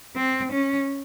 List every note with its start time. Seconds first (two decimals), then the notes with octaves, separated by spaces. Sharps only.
0.16 C4
0.52 C#4